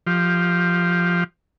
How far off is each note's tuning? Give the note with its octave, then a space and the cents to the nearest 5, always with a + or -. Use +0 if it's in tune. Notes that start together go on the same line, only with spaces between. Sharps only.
F3 +0 G4 +0